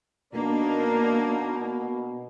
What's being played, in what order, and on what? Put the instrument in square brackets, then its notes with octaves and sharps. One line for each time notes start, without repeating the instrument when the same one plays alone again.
[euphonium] B2 [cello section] A#3 [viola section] D4 D#4 A#4